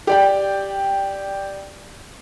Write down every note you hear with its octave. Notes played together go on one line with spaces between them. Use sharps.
G4 D5 G5